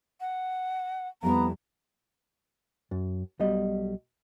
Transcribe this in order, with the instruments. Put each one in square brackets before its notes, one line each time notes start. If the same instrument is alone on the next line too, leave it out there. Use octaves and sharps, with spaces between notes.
[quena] F#5
[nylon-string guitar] F2 G3 E4 [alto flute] B3 [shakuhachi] A#5
[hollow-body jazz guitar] F#2
B1 B2 G3 D#5